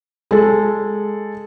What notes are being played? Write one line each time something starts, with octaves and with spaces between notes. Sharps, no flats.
G#3 A4